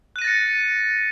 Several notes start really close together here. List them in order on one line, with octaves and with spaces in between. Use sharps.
F#6 D#7 A#6 A6 C#7